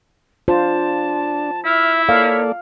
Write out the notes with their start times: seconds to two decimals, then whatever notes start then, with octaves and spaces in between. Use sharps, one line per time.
0.48 D4 F4 C5 A5
1.65 E4 E5 F6
2.09 A#3 A4 C#5 D5 F5